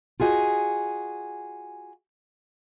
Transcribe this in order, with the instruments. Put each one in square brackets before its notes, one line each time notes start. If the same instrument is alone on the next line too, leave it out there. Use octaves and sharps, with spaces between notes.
[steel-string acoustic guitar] F4 F#4 G#4 D#5 G#5